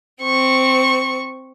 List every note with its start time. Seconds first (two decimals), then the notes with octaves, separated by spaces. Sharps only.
0.23 C4 C#6